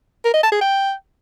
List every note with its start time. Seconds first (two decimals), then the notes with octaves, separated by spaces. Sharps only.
0.25 A#4
0.34 D#5
0.43 A5
0.52 G#4
0.61 G5